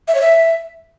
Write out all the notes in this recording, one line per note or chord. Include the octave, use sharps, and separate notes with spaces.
E5
C#5
E5